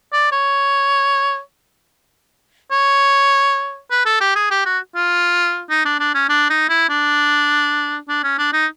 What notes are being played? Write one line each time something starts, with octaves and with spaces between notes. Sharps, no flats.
D5
C#5
C#5
B4
A4
G4
G#4
G4
F#4
F4
D#4
D4
D4
C#4
D4
D#4
E4
D4
D4
C#4
D4
D#4